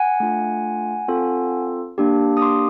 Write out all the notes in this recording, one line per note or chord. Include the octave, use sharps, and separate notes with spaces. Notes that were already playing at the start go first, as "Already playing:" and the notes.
Already playing: F#5 G#5
A3 D4 F4
C4 F4 A4
A#3 D4 G4
D#6
C6 D6